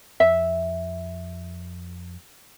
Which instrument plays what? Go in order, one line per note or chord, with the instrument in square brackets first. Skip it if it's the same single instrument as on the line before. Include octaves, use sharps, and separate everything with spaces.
[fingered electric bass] F2 [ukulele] E5